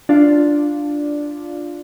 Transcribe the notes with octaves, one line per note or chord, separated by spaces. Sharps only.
D4 F4